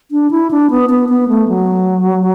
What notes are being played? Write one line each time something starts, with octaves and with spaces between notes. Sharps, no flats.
D4
E4
D4
B3
B3
B3
A3
F#3